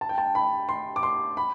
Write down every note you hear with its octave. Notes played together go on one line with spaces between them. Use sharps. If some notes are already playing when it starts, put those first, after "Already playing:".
A5
G5
A5
B5
C6
D6
C6
B5